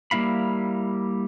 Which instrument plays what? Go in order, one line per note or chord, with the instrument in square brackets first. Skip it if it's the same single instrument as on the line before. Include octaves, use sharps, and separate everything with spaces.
[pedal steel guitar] G3 A#3 E4 F5 B5